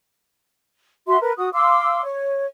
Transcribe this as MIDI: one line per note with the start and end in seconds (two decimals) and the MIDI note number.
1.07 1.17 66
1.07 1.17 76
1.07 1.17 84
1.21 1.32 70
1.21 1.32 71
1.37 1.49 66
1.37 1.49 87
1.53 2.01 77
1.53 2.01 84
1.53 2.01 86
1.53 2.01 88
2.04 2.46 73